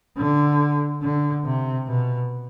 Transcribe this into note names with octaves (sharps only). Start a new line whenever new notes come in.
D3
D3
C3
B2